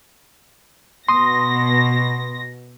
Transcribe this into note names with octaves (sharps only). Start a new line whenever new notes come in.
B2 C6 D#6 A#6